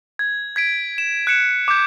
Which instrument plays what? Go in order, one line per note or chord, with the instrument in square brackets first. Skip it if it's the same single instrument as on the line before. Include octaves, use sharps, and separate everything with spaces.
[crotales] G#6
G#6 B6 D7
E7
F#6 C#7 E7
D6 G6